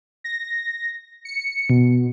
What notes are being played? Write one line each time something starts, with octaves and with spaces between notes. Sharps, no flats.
A#6
C#7
B2